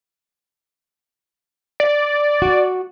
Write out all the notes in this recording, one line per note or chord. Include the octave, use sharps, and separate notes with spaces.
D5
F#4